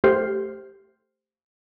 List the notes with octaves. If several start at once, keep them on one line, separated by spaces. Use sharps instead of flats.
A3 G4 C5 F6 G6 C7